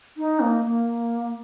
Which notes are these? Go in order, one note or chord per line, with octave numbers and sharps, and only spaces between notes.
D#4
A#3
A#3